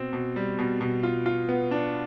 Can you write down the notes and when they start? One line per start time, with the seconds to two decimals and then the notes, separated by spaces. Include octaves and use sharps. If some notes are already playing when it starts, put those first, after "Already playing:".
Already playing: B2 C4
0.13 B2
0.36 G3
0.59 B2
0.81 B2
1.03 F4
1.26 F4
1.49 B3
1.71 D4